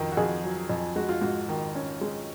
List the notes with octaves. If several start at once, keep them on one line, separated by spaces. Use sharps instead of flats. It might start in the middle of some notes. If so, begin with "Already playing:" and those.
Already playing: F2 D#3
F#4
F2 G#4
F#3
F2
G#3 F#4
F4
G#2 F#4
D#3
C#4
G#3